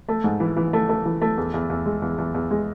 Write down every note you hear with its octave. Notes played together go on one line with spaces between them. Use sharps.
A3
G#2
E3
E3
A3
A3
E3
A3
E2
E2
E2
G#3
E2
E2
E2
G#3